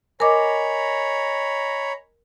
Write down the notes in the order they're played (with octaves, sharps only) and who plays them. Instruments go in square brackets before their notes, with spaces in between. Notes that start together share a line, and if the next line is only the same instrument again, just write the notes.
[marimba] A#4 D6 [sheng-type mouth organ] C#5 A#5 B5 [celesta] D#5 G#5